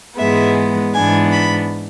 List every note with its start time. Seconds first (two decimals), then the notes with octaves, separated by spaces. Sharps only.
0.18 G#2 E3 G#3 B3 E5
0.94 G#2 E3 B3 D4 G#5
1.32 B5